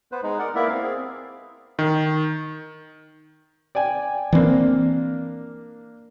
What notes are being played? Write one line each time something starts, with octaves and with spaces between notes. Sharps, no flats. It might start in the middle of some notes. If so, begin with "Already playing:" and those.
B3 B4 C5
G#3 D#4
A#4 D5 F#5
A#3 B3 E4 A#4 D5 E5
C4 F5
C4 G#4
D#3
D5 G5 G#5
E3 A#3 C4 D4